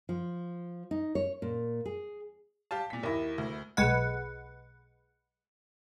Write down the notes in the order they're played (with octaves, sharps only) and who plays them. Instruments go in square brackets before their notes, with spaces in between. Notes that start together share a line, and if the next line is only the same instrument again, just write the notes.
[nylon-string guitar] F3
D#4
C#5
A#2
G#4
[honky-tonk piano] G4 F5 A5
A#2 B6
[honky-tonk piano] D#2 A#6 [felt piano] E4 A#4
[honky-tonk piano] D2
[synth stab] B1 G#3 B4 F#5